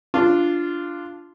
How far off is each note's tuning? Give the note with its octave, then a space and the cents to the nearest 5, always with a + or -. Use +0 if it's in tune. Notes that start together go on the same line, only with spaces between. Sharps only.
D4 +0 F4 -10